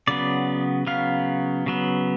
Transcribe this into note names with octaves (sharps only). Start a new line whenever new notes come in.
C#3 F#3 B3 D5
C#3 F#3 B3 F5
C#3 F#3 B3